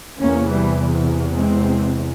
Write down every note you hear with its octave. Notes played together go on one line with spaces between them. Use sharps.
E2 C3 A#3 C#4
E3 G3
G#3 C4